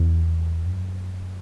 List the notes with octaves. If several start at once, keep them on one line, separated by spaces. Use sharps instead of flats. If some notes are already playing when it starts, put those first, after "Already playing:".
Already playing: E2
F#2